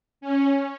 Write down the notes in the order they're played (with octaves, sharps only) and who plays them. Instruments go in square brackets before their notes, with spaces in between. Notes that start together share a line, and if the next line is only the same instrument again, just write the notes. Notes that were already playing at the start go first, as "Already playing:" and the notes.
[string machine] C#4